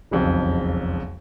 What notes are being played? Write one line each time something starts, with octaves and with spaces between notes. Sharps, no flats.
E1 B1 F2 C#3